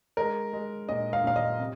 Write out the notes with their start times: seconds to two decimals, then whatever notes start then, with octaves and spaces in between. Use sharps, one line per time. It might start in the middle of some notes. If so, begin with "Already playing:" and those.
0.17 G#3 A#4
0.53 G#3
0.89 A#2 D#5
1.13 F5
1.24 A#2 F5
1.36 D#5
1.59 C3